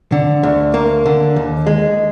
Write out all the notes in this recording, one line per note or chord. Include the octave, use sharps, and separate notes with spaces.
D3
D2
A#3
D3
D#2
G#3